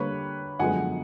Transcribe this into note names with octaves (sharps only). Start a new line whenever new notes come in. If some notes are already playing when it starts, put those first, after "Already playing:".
Already playing: D3 G3 A#3 B4 C#5
F#2 D3 F3 G#3 B3 F#5 G#5